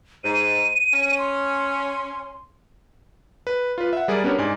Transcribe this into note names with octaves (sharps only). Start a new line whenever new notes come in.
G#2 D#7
C#4
C6
B4
F4 B4
E5 F#5
G3 G#4 A#4 D5
B3 C#4 D4 G4 A#4 C#5
G#2 D5 G#5